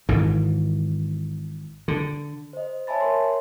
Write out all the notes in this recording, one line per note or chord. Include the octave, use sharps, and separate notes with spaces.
G#1 G#2 E3
D3
C5 D#5
C#5 E5 G#5 A5 B5 A6
A#4 C#5 C6